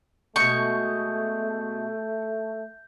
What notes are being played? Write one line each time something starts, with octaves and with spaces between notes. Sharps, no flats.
B2 G#3 A3 C#6 G6